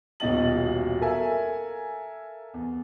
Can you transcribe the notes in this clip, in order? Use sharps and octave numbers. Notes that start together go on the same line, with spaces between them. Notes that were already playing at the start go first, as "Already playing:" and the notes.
D#1 B1 B2 D#5 A6 F#7
A4 A#4 E5 F5 G#5
E2